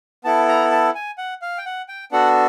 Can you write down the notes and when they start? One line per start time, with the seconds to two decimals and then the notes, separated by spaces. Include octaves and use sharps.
0.24 B3 E4 A4 A5
0.48 A#5
0.71 A5
0.95 G#5
1.18 F#5
1.42 F5
1.58 G5
1.66 F#5
1.88 G5
2.12 B3 D4 F#4 A4 F#5